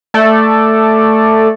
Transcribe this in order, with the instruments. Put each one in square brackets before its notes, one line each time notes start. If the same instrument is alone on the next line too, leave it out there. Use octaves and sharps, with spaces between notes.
[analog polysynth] A3 A4 D5